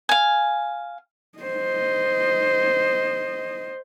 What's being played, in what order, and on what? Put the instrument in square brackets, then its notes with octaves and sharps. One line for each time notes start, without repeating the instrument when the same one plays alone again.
[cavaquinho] F5 G#5
[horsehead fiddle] C5 D#5